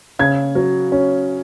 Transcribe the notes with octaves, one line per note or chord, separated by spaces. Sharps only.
C#3 G#6
F#3
C#4